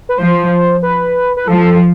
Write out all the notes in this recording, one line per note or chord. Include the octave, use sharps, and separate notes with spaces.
B4
F3 C5
B4
B4
F3 A4